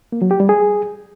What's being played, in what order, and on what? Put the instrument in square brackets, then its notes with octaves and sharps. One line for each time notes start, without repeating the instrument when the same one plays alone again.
[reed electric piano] A#3
F#3
G4
G3
G#4